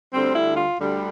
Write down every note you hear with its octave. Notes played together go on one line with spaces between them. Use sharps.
D2 D3 G3 C4
E4
F4
D2 D3 G3